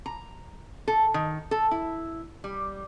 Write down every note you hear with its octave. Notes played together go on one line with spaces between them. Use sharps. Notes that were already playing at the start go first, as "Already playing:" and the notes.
A#5
A4
D#3
A4
E4
G3